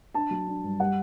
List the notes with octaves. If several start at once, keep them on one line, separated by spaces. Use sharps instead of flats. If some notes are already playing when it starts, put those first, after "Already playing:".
D4 A5
F#3
D4
G2
G3 F#5